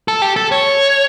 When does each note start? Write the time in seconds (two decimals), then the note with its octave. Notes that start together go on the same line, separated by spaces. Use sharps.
0.08 A4
0.22 G4
0.36 A4
0.52 C#5